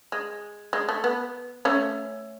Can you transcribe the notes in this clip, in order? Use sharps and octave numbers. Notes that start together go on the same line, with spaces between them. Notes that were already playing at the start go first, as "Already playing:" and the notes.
G#3
G#3
A3
B3
A3 C#4